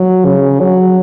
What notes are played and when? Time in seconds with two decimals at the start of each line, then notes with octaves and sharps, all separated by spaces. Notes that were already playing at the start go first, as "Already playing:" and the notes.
Already playing: F#3
0.25 C#3
0.61 F#3